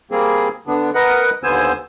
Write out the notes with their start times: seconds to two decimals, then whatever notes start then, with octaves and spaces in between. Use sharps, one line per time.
0.11 G3 A#3 C4 G#4
0.67 D3 B3 D4
0.95 A#4 B4 D#5 F#5
1.43 D#2 D3 B3 C5 G#5 E6